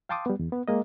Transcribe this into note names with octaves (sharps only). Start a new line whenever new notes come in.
F5 G5 A5 C6 D6 D#6
G3 B3
E2
B3
G#3 A#3 D#5